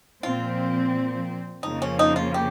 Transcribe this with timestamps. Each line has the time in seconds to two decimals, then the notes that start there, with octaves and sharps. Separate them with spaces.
0.23 A#2 F3 C4 F4
1.63 F2 C#3 F3 A#3 D#4
1.82 C#4
1.99 D#4
2.16 F4
2.34 G4